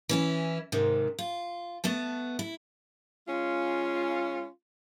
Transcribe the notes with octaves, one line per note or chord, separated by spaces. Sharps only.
E3 C#4 E4
G#2 C3 D#3
F4
A3 B3 A5
E4
G#3 C#4 F4